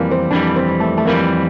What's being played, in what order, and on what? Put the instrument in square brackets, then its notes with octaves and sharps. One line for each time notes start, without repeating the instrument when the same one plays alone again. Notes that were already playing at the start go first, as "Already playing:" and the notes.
Already playing: [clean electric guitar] F2 E3 G3 [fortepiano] F3 A#3
[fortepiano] C4
[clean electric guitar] F2 E3 G3 [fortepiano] D4
[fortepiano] C4
A3
A3
[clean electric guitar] F2 E3 G3 [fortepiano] A#3